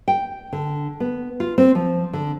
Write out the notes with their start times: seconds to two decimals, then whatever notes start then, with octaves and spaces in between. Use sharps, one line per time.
0.08 G5
0.53 D3
1.00 B3
1.40 F4
1.58 C4
1.75 F3
2.13 D3